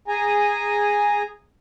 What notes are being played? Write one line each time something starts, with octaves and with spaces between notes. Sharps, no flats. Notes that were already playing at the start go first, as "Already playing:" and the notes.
G#4 G#5 A#5